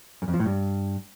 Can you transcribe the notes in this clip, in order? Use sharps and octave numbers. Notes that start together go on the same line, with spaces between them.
F#2
F2
F3
A2
G2